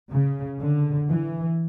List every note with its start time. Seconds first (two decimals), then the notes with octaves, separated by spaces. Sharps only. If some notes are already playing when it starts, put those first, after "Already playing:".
0.10 C#3
0.60 D3
1.09 E3